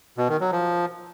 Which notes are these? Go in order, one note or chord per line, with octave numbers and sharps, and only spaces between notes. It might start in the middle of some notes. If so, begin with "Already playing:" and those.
B2
D#3
F#3
F3